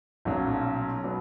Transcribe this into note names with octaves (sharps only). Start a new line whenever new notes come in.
B1 A#2 F#3 C#4
B2 F#3 B3